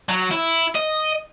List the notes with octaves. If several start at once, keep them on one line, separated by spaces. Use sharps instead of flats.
F#3
E4
D#5